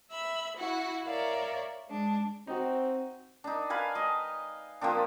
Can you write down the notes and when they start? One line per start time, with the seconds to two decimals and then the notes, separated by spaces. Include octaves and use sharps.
0.11 E5 B5 E6
0.57 E4 F#4 F#5
1.06 A#4 C#5 D5 E5 F5
1.87 G#3 D4
2.47 C4 D#4 F#4
3.44 D4 D#4
3.70 B4 F5 G#5
3.95 D#5 G#5
4.81 F3 A#3 C4 D4